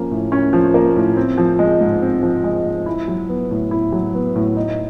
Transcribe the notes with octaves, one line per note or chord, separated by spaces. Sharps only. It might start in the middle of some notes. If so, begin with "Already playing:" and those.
Already playing: F3 A#3 C#4
A2
C#4
F3
A#3
A2
C4
F3
G#3
G#2
C4
F3
G#3
G#2
E4
F#3
B3
A2
E4
F#3
B3
A2
D#4